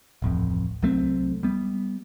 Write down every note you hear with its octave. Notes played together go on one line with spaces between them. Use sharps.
D1 A1 F2
C2 F#3 A3 C4
G3 B3